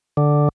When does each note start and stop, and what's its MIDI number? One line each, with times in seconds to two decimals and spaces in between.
0.17 0.49 50